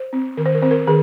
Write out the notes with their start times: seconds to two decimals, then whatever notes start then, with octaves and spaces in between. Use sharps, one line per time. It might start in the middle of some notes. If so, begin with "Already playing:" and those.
Already playing: C5
0.13 C4
0.37 D#3 A#4
0.46 C5
0.54 A#4
0.62 C4 C5
0.71 A#4
0.87 D#3 G#4